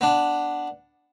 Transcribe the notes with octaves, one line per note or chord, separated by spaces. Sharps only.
B3 D4